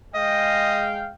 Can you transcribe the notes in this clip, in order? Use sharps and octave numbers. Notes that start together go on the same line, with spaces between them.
G#3 D#5 F5 G5